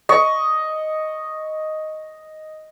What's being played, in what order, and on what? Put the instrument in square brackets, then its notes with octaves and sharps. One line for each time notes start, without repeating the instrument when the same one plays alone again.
[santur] D#5 C#6